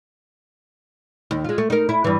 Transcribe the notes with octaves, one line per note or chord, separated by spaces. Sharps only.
D#2
G#3 F4
A3
D#4 A#4
E4
G2 E3